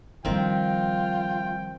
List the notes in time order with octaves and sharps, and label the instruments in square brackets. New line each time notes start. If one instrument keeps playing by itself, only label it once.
[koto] D#3 C4 [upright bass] F3 G3 [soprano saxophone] F4 [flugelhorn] G5